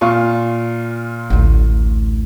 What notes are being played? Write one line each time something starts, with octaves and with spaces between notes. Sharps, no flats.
A#2 F4 C#6
A1 D2